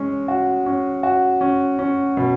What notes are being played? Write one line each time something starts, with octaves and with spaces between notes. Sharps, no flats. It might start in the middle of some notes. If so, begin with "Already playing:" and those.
Already playing: G#3 C#4
F#4
C#4
F#4
C#4
C#4
B2